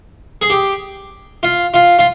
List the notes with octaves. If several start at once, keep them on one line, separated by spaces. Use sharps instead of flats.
G#4
G4
F4
F4
F4